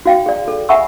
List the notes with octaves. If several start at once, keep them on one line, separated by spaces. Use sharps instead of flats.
F#4 F5 G5
G#4 D5
A4
E5 F#5 G#5 B5 C#6 E6